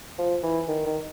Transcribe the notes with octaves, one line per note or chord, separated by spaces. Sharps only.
F3
E3
D#3
D#3